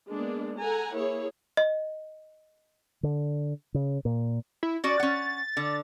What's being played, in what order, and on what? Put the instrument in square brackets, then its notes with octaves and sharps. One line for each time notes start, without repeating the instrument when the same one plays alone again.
[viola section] G#3 A#3 B3 D4
A4 F#5 G#5 A#5
A#3 E4 G#4 C#5
[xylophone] D#5
[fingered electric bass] D3
C#3
A#2
[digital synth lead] E4
[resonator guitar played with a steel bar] C#4 F#4 D5 [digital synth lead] A6
[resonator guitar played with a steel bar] C#4 F#5
D3